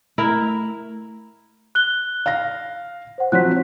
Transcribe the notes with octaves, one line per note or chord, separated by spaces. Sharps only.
A3 E4 A#4
F#6 G7
F5 A#6
C5 F#5
F3 F#3 C4 F#6 B6